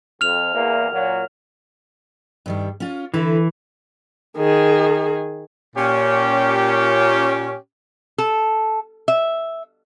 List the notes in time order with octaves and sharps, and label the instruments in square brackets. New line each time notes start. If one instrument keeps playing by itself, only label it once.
[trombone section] F2 [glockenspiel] F6 F7
[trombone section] E2 A#3
A#2 F#3
[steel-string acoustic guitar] G2 D#3 G3
C#4 F4
[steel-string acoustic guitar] D3 E4 B4 [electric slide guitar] E3
[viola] D#3 G#4
[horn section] A#2 C#4 G4
[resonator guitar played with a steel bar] A4
E5